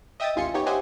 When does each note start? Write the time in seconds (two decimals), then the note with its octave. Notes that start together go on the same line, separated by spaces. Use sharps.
0.20 D#5 E5 G5 D#6 E6 A6
0.36 A1 D#2 F4 G#5 C6 C#7
0.54 B3 D#4 G4 C#5
0.66 G4 C5 D#5 E5 F#5 G#5